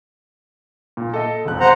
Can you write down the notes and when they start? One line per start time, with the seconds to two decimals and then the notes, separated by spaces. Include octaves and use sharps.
0.97 A#2
1.14 A4 D#5
1.45 E1 F2 F#6
1.60 C5 F#5 A#5